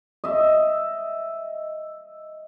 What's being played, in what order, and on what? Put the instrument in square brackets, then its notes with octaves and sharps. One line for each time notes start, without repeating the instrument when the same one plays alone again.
[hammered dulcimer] D#5 E5